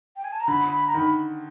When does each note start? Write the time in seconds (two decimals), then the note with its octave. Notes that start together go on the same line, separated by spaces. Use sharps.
0.16 G5
0.24 G#5
0.32 A5
0.40 A#5
0.48 D3 B5
0.71 B5
0.87 A#5
0.94 D#3 B5